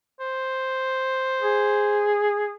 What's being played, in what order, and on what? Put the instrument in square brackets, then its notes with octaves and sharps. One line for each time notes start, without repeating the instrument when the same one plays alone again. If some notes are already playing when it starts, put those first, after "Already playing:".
[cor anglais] C5
[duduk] G#4